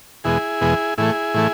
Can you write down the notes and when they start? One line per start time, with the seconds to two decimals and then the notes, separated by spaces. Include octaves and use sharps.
0.24 E2 B2 G#3 E4 G#4
0.61 E2 B2 G#3
0.98 A2 E3 A3 E4 G#4
1.34 A2 E3 A3